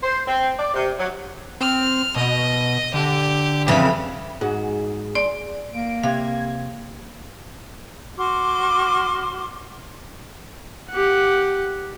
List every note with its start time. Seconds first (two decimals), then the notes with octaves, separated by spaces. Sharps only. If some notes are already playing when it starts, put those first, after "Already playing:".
0.03 C5
0.27 C4
0.59 D5
0.75 C3
0.98 F#3
1.61 C4 F6
2.16 B2 D#5
2.94 D3 G4
3.68 F2 C#3 E3 B5
4.41 G#2 F#4 G#4
5.15 D5 C6
5.73 A#3 D7
6.03 C3 F5 G#6
8.18 F#4 C6 D6 F6
10.91 G4 F#5